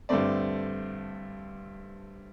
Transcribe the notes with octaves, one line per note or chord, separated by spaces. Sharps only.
G2 D3 A3 C4 D5